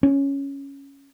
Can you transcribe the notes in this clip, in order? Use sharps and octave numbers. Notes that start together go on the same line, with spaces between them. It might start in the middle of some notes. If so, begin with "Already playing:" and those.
C#4